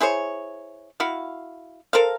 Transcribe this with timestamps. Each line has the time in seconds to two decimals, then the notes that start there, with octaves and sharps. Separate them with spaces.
0.01 E4 G#4 C5 C#5
1.00 E4 F#4 F5
1.93 A4 A#4 C5 F5